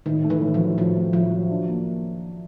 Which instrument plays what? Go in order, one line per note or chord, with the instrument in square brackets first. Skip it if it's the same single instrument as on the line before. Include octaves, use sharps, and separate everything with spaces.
[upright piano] A2 [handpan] D#3
[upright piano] A3
[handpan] E3
[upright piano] A2
[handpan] F3
[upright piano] F#3
[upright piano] A2 [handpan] F3
[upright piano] A3
[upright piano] A2 [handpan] F3
[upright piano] F#3
D4
A#3